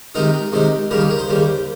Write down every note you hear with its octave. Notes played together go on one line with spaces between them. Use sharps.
C3 D#3 G#3 C4 D#4 A#4
C3 D#3 G#3 C4 D#4
D#2 C#3 G3 A#3 A#4
G#4
A#4
C5
D#2 C#3 G3 A#3